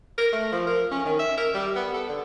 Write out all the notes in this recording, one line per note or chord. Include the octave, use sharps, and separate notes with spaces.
A#4
A3
F3
A#4
C#4
D#3
E5
A#4
G3
B3
A4
D3